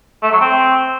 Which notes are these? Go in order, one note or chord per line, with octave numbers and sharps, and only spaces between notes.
A3
F#3
C4